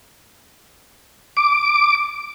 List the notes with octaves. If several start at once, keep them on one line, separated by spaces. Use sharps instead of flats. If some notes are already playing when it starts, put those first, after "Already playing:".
D6